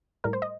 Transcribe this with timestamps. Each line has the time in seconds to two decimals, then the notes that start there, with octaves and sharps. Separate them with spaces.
0.24 A2 G3 A#4
0.33 C5
0.42 D#5